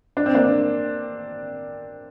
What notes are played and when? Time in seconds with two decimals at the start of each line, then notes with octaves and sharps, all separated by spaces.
0.17 D4
0.26 C4
0.35 A#3 D4